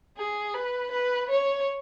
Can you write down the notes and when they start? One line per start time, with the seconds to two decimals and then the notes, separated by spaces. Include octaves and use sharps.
0.17 G#4
0.54 B4
0.91 B4
1.30 C#5